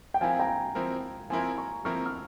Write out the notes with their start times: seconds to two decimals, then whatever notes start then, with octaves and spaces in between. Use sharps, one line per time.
0.14 G5
0.21 F3 C4 E4 A#4 F5 G#5
0.39 G5 A#5
0.75 F3 C4 E4 A#4
1.30 F3 C4 E4 A#4 G#5 C6
1.58 A#5 C#6
1.85 F3 C4 E4 A#4 C#6 F6
2.06 F6